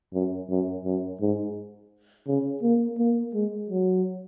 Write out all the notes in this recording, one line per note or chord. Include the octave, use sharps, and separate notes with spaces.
F#2
F#2
F#2
G#2
C#3
A#3
A#3
G#3
F#3